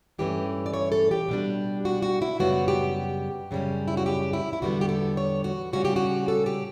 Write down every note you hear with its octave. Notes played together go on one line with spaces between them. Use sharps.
G2 E3 A3 C#4 G4
D5
C#5
A4
G4
B2 G3 D4
F#4
F#4
E4
F#2 C#3 G3 B3 F#4
G4
F#2 C#3 G3 C#4
E4
F#4
G4
E4
E4
E2 D3 G3 B3 F#4
G4
A4
C#5
F#4
C#3 G3 C#4 F#4
G4
F#4
A4
G4